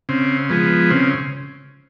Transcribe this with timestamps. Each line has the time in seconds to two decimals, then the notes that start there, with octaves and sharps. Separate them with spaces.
0.09 C#3 C4
0.49 F3 G#3 B3
0.91 C#3 C4